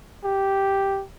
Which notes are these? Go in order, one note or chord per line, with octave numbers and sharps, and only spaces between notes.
G4